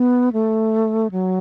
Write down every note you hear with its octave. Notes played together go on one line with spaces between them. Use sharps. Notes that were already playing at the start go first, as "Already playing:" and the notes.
Already playing: B3
A3
F#3